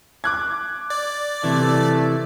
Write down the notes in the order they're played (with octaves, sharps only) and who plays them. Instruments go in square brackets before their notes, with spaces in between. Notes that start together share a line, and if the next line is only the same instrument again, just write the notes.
[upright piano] D6 F#6 G#6
[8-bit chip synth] D5
[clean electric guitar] C3 E3 [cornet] A3